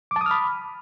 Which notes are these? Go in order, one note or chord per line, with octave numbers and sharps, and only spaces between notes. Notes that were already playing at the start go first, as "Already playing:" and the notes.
A5 B5 D6 D#6 F6